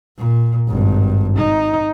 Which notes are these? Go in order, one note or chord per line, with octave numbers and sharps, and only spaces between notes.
A#2
G#1 G2
D#4